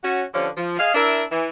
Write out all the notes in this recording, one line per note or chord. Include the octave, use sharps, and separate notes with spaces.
C#4 F#4
D3 F3 C#4 D4 G4
F3
G#4 D#5 F5
D4 E4 A#4 E5
E3